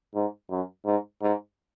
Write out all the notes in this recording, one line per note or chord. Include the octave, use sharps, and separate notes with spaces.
G#2
F#2
G#2
G#2